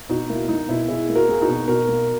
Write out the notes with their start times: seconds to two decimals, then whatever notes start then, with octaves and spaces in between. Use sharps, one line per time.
0.09 B2 D#4 F#4
0.29 A#3 E4
0.48 A#3 D#4
0.69 B2 E4
0.88 B2 E4 G#4
1.09 A#3
1.15 F#4 A#4
1.28 A#3 G#4
1.41 D#4 F#4
1.48 B2
1.68 B2 F#4 A#4
1.88 A#3